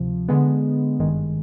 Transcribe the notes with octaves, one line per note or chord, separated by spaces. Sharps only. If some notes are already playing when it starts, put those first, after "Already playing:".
Already playing: D2 C3 F3
D3 G#3 B3
G#1 G2 D#3 G#3